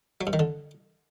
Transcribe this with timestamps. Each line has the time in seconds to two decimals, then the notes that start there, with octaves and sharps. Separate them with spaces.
0.21 F#3
0.27 G2
0.33 D#3
0.39 D3